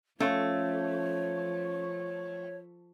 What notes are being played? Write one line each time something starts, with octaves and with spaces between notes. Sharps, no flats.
F3 A3 C#4 C#5 F5 C6